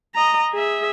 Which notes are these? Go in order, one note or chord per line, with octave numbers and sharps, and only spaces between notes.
D#5 A#5
G#4 E5